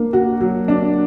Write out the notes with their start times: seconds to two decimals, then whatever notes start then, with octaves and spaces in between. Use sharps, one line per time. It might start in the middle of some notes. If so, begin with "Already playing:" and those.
Already playing: A#3 D4
0.13 F#4
0.41 F#3
0.68 D4